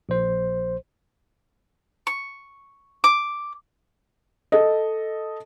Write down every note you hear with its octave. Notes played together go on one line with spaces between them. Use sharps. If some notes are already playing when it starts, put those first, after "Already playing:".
A#1 C5
C#6
D6
A4 D#5